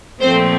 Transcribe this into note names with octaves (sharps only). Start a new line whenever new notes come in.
A#2 F3 A3 C4 C5